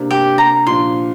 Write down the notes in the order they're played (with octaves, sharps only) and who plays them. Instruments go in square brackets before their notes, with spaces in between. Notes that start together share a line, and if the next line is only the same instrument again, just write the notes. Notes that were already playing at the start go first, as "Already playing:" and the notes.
Already playing: [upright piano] C3 A#3 D4
[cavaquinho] G4
A#5
[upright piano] A#2 F3 D4 [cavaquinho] C6